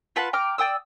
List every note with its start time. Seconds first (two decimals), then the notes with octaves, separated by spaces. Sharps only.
0.16 F4 B4 F#5 A5
0.33 G5 A#5 D6 F6
0.58 D5 G5 D#6 E6